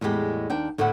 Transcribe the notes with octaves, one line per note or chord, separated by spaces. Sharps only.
E2 A2 G3 G#3 G4
D#2 D4 G5
D2 A2 A3 E4 F#5